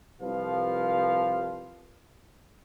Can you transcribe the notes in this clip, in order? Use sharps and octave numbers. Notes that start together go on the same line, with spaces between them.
C2 F3 B4 F5